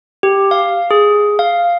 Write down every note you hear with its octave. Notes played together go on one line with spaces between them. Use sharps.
G4
F5
G#4
F5